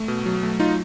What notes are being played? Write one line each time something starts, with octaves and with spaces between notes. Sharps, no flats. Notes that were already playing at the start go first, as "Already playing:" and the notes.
Already playing: A3
B2
F#3
A3
F#3 D#4 F4